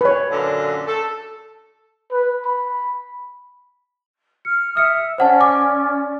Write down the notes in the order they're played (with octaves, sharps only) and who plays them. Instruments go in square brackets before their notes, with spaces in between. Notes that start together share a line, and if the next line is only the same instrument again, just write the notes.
[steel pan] B4 C#5
[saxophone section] F#2 A#2 D3
A4
[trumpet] B4
B5
[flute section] F6 [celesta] C#7
[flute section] E5 [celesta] D#6 F6 C#7
[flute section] C#4 D5 [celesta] C5 F#5 A5
[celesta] G#5 D6